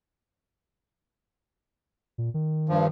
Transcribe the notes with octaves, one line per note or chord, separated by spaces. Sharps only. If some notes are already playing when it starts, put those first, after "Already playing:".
A#2
D#3
G2 F3